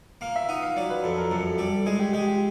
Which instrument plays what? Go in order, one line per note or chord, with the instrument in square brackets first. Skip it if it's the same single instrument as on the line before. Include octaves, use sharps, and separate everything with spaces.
[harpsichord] A#3 [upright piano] F5
[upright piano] E5
[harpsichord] D#4 [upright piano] F#5
[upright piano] F5
[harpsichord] F#3 [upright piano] D5
[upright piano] B4
[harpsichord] F2 [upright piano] A4
[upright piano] A#4
[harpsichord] F#2 [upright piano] A4
[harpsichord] G3 [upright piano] A4
[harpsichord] G#3 [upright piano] G#4
[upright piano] G4
[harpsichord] G#3 [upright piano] G4
[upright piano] G4